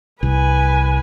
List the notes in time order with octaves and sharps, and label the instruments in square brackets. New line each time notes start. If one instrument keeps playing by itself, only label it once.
[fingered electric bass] C2 [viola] B4 G#5